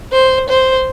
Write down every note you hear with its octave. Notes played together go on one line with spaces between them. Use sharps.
C5
C5